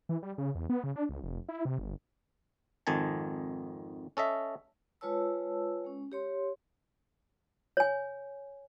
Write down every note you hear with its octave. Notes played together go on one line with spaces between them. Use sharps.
E3
G3
C#3
E2
B3
C#3
D4
C#2
F1
E4
C3
G1
G#1 F2 D#3 G#5 A5
C#4 A4 D#5 E5
G#3 F4 B4 C#5 A5 E6
G#3 C#4
G4 C#5 C6
C#5 G#5